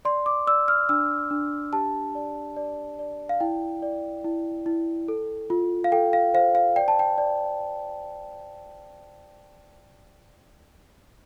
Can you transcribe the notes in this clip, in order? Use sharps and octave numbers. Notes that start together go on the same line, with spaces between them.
D5 C6
D6
D5 E6
F6
D4 E6
D4
G4 A5
D5
D5
D5
F5
E4 G5
D5
E4
E4
A4
F4
F5
A4 G5
F5
C5 F5
F5
D5 G5
A5
G5
D5